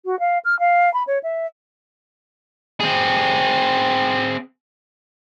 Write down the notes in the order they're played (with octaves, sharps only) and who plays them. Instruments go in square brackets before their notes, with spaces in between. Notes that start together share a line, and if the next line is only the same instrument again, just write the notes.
[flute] F#4
F5
F6
F5
B5
C#5
E5
[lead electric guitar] C4 G#4